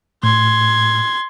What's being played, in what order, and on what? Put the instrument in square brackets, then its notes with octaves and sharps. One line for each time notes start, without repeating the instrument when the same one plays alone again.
[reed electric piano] A2 [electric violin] C6 G#6